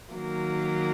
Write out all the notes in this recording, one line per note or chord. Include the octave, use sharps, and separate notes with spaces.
D#3 F#3 A#3